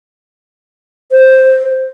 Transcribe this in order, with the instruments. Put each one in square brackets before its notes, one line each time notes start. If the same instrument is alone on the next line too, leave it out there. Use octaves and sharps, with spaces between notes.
[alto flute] C5